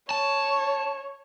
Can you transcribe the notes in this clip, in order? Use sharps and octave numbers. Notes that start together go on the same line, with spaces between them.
C#5 A5